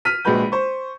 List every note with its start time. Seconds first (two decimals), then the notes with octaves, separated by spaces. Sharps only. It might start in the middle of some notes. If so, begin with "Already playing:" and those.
0.05 F6 B6 D#7
0.25 A#1 G#3 F#4 B4 B5 G6
0.52 C5 C#6